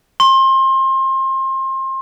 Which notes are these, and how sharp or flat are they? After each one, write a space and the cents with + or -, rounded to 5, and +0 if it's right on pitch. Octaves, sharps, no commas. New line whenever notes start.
C6 +30